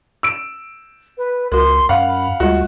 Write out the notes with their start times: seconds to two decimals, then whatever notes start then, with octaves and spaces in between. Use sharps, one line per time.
0.23 E6 D7
1.18 B4
1.52 C#2 F#4 A#4 C6
1.89 F#2 F5 F#5 B5
2.40 D2 G3 G#3 F4 F#4